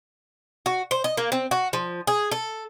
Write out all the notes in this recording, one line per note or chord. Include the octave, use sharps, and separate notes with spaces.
F#4
C5
D#5
A#3
C4
F#4
F3
G#4
A4